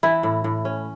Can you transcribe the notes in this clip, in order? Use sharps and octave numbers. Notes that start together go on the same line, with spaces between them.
E3 E4
A2
A2
C#4